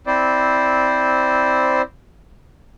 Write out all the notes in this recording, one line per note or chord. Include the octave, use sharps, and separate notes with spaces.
C4 E4 C5 D5